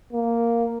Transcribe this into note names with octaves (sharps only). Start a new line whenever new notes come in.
A#3